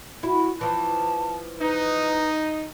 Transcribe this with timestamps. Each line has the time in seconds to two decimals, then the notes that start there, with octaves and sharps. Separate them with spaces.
0.23 E4 F#4
0.61 E3 F3 A5
1.59 D#4 B4